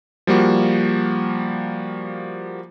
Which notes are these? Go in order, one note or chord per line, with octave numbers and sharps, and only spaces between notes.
F3 G3 A#3 F#4